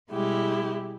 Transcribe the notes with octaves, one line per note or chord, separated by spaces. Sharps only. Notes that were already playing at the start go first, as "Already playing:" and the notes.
B2 G3 G#3 E4 G4